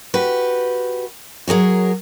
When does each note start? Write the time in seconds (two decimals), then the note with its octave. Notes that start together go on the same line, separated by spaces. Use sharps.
0.14 F#4 G4 B4
1.48 F#3 G#4 A#4 C#5